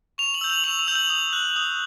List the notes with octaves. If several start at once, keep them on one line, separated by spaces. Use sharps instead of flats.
C#6 F7
F#7
E6 G6
F#7
C#6 F7
F7
E6 G6
F#7
D#6
F#6
D#6